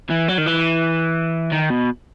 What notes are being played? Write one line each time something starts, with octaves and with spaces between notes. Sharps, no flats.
E3
F#3
D#3
E3
D#3
B2